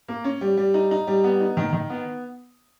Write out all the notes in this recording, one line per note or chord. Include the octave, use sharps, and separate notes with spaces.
A#3
C#4
G3
G3
D#4
D#4
G3
B3
D#4
D#3
D#3
B3